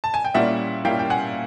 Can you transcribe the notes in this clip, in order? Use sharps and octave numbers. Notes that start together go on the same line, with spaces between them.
A5
G#5
G5
A#2 G3 A#3 C#4 E4 E5 F#5
A#2 G3 A#3 C#4 E4 F5 G5
G5
F#5 G#5